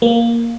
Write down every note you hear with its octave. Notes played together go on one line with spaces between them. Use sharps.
A#3